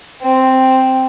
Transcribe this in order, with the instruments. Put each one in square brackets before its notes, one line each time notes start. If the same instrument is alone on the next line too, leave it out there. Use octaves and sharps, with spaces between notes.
[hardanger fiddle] C4